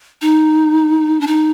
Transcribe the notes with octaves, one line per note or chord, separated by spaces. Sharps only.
D#4
D4
D#4